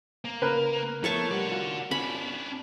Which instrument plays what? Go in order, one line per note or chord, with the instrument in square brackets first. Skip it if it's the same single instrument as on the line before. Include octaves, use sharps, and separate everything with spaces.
[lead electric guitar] A#3
[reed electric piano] C#3 [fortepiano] A#4 B4
[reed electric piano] F3 B3 [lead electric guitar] A3 [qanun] C#5 A5 C#6
[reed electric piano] G3 [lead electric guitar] D5 F#5
[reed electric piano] F4 F#4
[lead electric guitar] C#4 D4 [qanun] B5